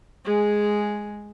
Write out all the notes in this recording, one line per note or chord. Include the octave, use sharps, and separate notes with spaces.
G#3 G#4